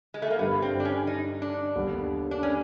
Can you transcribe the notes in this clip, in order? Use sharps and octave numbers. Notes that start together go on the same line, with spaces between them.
G#3
A3
A#3
G2 D3 G3 B3
C4
D4
C#4
D#4
D4
D#2 D3 G3 B3
D4
C#4